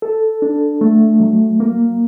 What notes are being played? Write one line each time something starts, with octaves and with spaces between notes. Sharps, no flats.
A4
D4
A3
F#3
A#3